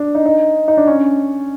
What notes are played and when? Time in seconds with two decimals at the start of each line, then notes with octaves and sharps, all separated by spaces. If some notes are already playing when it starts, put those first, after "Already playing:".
Already playing: D4
0.15 D#4
0.26 D#4
0.68 D#4
0.77 D4
0.87 C#4